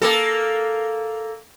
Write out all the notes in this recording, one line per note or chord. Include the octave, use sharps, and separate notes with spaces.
A#3 A4